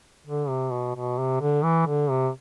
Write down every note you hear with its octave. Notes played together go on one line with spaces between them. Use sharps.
D3
C3
B2
B2
C3
D3
E3
D3
C3